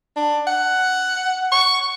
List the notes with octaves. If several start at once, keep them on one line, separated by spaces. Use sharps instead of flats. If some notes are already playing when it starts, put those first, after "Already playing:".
D4
F#5
C#6